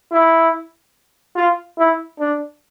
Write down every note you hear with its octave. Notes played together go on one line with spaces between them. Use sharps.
E4
F4
E4
D4